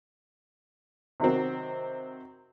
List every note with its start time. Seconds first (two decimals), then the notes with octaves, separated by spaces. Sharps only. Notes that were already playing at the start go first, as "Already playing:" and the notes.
1.20 C3 D#3 F#3 C4